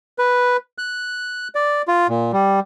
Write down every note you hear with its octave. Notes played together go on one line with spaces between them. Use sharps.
B4
F#6
D5
F4
A#2
G3